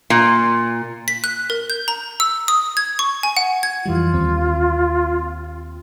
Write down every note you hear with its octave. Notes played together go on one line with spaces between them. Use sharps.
A#2
B6
F#6
A#4
G6
A#5
E6
D#6
G#6
C#6
G#5
F#5
G#6
F2 E3 G3 F4
D#2 C4